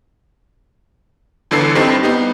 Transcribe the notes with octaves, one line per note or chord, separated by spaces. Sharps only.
G1 D3 E3 A4 C7
G2 G3 C4 D#4
G3 B3 D#4